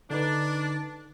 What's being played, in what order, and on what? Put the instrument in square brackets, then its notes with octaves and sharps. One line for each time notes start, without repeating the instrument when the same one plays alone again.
[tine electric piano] D3 D#4 B4 [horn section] D4